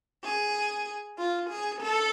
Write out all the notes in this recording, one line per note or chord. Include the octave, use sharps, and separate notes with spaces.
G#4
F4
G#4
A4